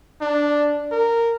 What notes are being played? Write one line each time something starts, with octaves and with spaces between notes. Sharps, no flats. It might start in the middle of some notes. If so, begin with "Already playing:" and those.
D4
A#4